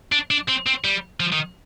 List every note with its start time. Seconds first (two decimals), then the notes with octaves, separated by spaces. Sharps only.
0.12 D4
0.31 D4
0.49 C4
0.66 C4
0.84 G3
1.20 F3
1.33 D#3